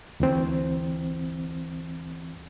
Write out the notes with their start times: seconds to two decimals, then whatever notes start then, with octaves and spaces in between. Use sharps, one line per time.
0.20 D2 E3 C4